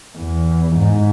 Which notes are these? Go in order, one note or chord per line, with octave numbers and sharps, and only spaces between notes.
E2
G#2